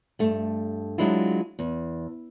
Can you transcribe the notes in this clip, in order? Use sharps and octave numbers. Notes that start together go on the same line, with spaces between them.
G2 A3
F#3 G#3 D4 E4 F4
E2